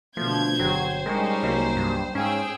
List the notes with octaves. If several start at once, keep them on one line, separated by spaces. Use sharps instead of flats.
B2 D3 F3 A3 G6 G#6
G1 F#3 C5 G5
G3 G#3 C#4 D#4 A#4 G5 C#6
C2 F#3 A#3
G2
G#2 C#4 G#4 F5 G5 E6